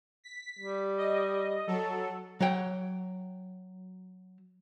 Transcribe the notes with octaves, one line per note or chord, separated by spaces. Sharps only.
B6
G3
D#5
F#3 A4
F#3 F#4 C#5 F#5 G5